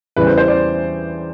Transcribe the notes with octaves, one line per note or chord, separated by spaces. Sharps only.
E2 C#3 E3 G3 B4
C5
C5
D5